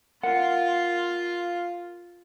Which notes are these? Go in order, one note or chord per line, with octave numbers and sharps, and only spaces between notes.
F4 A#4 F5 F#5